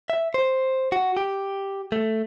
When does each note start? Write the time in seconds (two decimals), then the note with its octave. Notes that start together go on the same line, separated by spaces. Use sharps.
0.10 E5
0.34 C5
0.92 F#4
1.17 G4
1.92 A3